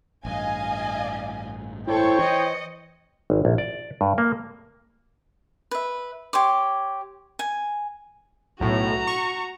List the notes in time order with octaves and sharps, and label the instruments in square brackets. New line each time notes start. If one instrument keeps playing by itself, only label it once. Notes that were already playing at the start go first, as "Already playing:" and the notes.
[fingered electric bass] A1 G2 [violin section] D#5 F5 G#5
[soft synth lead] E4 [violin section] A4 C#6 [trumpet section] C5 C#5 G5
[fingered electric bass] E3 [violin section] D#5 [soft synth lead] C#7
[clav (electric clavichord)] G#1
A#1
D5
G2
A#3
[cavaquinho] B4 E5
G4 C#5 C6 D6
G#5
[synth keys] B1 A2 [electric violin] F#4 A#5
[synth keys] C#6